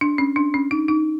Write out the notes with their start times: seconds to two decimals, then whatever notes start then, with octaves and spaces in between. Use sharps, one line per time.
0.01 D4
0.18 C#4
0.36 D4
0.54 C#4
0.71 D#4
0.88 D#4